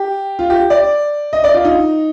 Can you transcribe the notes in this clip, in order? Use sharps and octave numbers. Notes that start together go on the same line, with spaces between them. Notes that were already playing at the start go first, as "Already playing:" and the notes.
Already playing: G4
F4
G4
D5
D#5
D5
F4
D#4